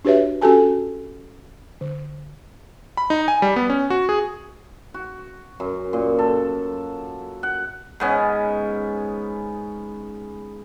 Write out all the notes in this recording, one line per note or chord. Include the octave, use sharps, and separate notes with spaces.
D4 F#4 G4 B4 C#5 E5
C#4 F#4 G4 A4 G#5 A5
D3
B5
D#4
G#5
G3
B3
C#4
F#4
G#4
F#4
F#2
A#2
A4
F#5
G#2 B3 C#4